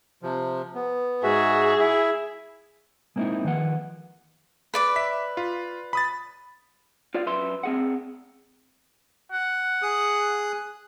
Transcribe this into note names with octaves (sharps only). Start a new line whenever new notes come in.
C3 F3
B3
G#2 F#4 G#4 E5
E4 E5
G#3 A#3 C4 D#4 E4
D#3 F3 B4 F#5
B4 D5 D6
E5 B6
F4
B5 D#6 A6
F4 C5 D5 F5
F#2 B4 E5 C6
C4 G#4 F#5
F#5
G#4 D#6 F#6